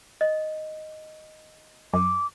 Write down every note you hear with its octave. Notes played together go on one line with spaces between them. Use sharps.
D#5
F#2 D6